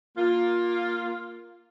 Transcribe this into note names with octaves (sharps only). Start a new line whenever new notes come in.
A#3 F4